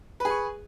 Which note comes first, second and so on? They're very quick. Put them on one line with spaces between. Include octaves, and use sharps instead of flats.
B4 G#4 C#6